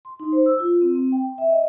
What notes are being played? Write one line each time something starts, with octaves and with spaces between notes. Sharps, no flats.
C6
D#4
C5
E6
F4
C4
C4
G5
E5
D#5